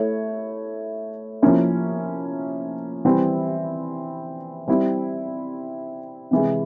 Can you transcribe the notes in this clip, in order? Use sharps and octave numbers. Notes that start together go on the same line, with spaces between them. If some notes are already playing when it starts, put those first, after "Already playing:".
Already playing: A3 E4 C#5
F3 A#3 C#4 E4
E3 G3 C4 E4
G3 C4 E4
C3 E3 G#3